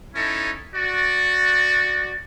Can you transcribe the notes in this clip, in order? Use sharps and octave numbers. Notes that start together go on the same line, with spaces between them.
C#4 D#4 E4 A4
F#4 D5